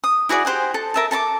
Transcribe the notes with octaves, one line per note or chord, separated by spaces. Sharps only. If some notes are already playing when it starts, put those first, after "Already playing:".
D#6
E4 F#4 G#4 D5
G4 C5 F#5 G#5
A4
A#4 E5 A5
A4 A5 A#5 D6